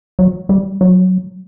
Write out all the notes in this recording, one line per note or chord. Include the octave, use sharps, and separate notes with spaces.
F#3
G3
F#3